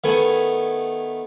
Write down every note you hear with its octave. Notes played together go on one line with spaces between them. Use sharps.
D#3 A3 B3 G#5